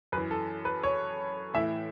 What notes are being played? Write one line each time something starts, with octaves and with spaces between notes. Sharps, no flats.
F#2 E3 B4
A4
B4
C#5
A2 E3 E5